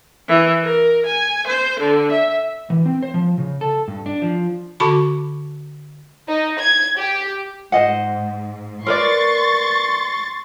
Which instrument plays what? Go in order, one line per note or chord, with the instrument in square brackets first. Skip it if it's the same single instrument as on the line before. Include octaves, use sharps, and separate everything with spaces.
[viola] E3
A#4
G#5
C5
D3
E5
[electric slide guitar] E3
C4
C5
F3
C#3
A4
G2
D4
F3
[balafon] D3 F#4 A5 B5 C#6 D6
[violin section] D#4
G#6
G4
[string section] G#2 [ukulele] C5 D#5 F#5
[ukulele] A#4 B4 D5 [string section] C6 C#6 A6